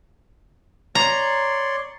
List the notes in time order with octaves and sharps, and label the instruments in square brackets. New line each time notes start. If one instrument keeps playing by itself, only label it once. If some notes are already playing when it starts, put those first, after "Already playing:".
[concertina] C#5 D5 C6 [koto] A#5